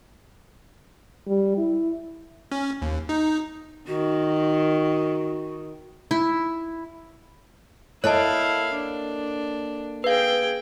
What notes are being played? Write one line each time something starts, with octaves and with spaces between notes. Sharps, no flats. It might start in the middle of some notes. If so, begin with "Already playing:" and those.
G3
E4
C#4
D#2
D#4
D#3 F#4
E4
A#3 E4 A4 C#5 D#5 F5 A5
D4
G#4 B4 F5 G5